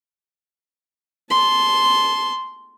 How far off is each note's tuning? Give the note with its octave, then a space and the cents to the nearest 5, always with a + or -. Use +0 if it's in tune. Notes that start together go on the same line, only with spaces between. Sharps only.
A5 -20 C6 +0